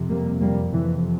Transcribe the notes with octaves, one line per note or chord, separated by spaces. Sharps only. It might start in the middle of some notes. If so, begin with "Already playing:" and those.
Already playing: F2 C3
G3 A#3
G3 A#3
F2 C3 E3